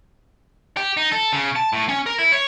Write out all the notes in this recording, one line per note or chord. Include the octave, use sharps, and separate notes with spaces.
G4
D#4
A4
C#3
A5
A2
C#4
A#4
E4
C#5